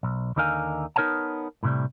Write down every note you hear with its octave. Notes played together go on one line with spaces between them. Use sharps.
B1
D#2 D3 D#4 A#4 F5 G#5
B3 D#4 A#4 C#5 F#5 A5
A2 C3 G3